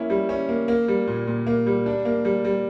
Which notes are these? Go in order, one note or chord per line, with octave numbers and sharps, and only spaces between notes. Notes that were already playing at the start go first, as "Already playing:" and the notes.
Already playing: A#3 C#4 E4
G3
C#4
A#3
A#3
G3
A#2
A#2
A#3
G3
D4
A#3
G3
G3